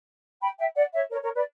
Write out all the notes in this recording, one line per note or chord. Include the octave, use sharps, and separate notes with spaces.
G5 B5
E5 G5
D5 F#5
C#5 E5
A#4 C#5
A#4 C#5
B4 D5